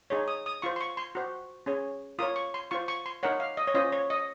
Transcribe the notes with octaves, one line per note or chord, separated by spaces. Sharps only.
D#4 G#4 C#5
D#6
D#6
F4 C5 C#6
C6
C#6
C6
F#4 C5
C#4 G#4 C#5
F4 A#4 C#5 D#6
C#6
C6
F4 C5 C#6
C#6
C6
D#4 A#4 C#5 F#5
F5
D#5
C#5
C#4 F4 C5 D#5
C#5
D#5